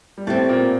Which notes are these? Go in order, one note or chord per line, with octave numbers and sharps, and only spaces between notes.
G3
A2 A3 C4 G4 D5
A#2 A#3